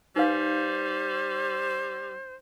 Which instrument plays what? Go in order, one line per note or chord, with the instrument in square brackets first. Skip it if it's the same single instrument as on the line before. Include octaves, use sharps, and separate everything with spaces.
[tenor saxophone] G3 [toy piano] D#4 B4 F5 [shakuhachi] C5